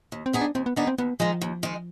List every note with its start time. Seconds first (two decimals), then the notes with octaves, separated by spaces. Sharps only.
0.12 D#2
0.26 C4
0.33 D#3 B3 D#4 G#4
0.41 D4
0.55 D#2 C4
0.66 B3
0.76 D#3 B3 D4 D#4 G#4
0.87 C4
0.98 D#2 B3
1.20 D#3 F3 G#3
1.41 D#2
1.63 D#3 G#3